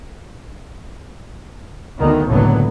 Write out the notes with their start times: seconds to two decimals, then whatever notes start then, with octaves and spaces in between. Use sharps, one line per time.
1.98 D2 D#3 B3
2.30 F#1 C#2 A2 D3 F#3 B3